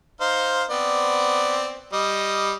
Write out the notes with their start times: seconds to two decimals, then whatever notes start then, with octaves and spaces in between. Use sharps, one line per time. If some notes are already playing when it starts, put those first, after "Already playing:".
0.21 D#4 C5 F5
0.70 B3 C4 D5
1.93 G3 D#5